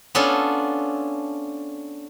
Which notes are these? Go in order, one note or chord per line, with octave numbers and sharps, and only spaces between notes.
B3 C#4 D4 F4 A4